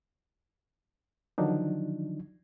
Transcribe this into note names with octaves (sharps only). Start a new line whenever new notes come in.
D3 D#3 F3 F#3 D4 D#4